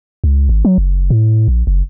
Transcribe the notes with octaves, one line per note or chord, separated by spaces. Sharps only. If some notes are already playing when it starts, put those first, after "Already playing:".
C#2
G#1
F#3
F#1
A2
A#1
F#1